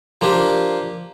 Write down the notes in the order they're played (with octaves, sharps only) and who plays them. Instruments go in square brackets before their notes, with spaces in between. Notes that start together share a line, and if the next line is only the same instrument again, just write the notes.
[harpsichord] F3 A#3 D4 G4